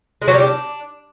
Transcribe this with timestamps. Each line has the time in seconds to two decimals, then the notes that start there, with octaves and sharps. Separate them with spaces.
0.22 G#3
0.28 F#3
0.34 G3
0.40 G4
0.46 D4